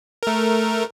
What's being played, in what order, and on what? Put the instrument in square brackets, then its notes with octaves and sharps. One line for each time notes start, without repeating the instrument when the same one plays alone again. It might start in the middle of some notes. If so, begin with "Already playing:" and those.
[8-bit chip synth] A3 A#4